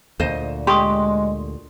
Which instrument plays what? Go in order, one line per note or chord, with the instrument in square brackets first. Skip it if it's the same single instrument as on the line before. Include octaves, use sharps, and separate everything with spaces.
[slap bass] D2 A#2 [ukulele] C5 D#5
[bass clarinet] G#3 [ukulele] G4 [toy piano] C6 C#6 D#6